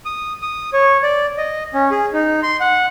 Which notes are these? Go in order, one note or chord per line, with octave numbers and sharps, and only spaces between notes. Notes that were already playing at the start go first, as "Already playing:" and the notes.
D#6
D#6
C#5
D5
D#5
C#4
G#4
D#4
C6
F#5